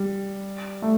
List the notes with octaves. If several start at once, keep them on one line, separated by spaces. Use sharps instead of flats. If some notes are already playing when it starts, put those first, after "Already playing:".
Already playing: G3
A3